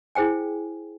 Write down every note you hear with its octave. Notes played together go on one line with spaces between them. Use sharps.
E4 G#4 C5 G5 G#5